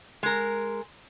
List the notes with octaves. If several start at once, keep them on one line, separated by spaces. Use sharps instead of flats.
G#3 A#4